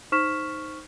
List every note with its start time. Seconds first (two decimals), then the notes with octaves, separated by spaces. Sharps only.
0.12 D#4 C5 C#6 F6 B6 E7